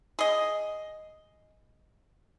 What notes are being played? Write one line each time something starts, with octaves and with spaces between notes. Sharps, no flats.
G#4 D#5